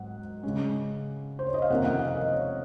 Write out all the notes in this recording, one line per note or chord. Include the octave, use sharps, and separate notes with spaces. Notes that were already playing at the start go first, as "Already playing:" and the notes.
Already playing: G#2 F#3 F#5
C#3 G#3 C#4
C5
C#5
D#5
F5
F2 C3 D#3 A#3 C#4 F#5
F#5
D#5
F5
D#5
C#5